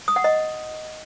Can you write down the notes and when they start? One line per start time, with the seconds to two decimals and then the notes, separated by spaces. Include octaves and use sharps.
0.08 D#6
0.16 F#5
0.24 D#5